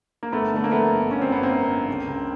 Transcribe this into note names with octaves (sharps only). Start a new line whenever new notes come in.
A#3
G1 A3 B3
D3 A3
A#3
F2 A3 B3
G1
D3 C#4
C4
G1 B3
A#3 C4
G1
G1
C#2
C#2